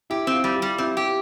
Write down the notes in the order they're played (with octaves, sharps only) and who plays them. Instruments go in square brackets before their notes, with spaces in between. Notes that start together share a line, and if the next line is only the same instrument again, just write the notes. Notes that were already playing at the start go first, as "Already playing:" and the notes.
[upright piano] E4 [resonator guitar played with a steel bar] G4
[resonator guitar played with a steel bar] C4
[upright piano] F4
[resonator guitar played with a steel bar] G3
[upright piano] G4
[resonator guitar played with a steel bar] G3
[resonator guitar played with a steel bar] C4 [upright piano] E4
[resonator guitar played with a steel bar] G4